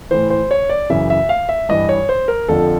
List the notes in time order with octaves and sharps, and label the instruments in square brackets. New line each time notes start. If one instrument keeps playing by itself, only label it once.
[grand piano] A2 E3 C5
C5
C#5
D5
F#2 C#3 E3 E5
E5
F5
E5
G2 E3 D#5
C#5
C5
A#4
F2 D3 F3 A4